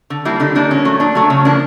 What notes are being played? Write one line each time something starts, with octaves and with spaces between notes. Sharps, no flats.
D3
G3 A#3 E4
D3 D#4
G3 A#3 D4
A#2 C#4
F#3 A3
A#2 D4
F#3 A3
C#3 C#4
F3 A#3 D4